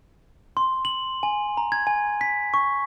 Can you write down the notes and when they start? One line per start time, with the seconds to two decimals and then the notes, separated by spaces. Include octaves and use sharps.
0.57 C6
0.85 F#7
1.23 G#5
1.57 A#5
1.72 G#6
1.87 G#5
2.21 B6
2.54 C#6